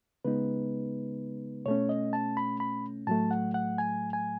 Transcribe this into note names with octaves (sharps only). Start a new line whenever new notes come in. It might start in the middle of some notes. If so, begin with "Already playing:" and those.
C#3 G#3 B3 D#4 B4
B2 A3 C#4 C#5
D#5
A5
B5
B5
A2 F#3 A3 A5
F#5
F#5
G#5
G#5